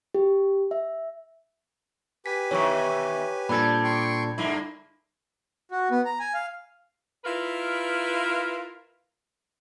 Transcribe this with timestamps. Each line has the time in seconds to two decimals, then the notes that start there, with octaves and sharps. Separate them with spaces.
0.15 G4
0.71 E5
2.26 G4 B4 G#5 B6
2.51 B2 D#3 E3 C#5 C#6
3.49 A#2 G3 C4 D4 A4 B5 G#6
3.84 G5 C6 C#6
4.38 G2 D3 A#3 E4 E5 C6
5.71 F#4
5.91 B3
6.05 A#5
6.20 G#5
6.34 F5
7.25 E4 F4 A#4 B4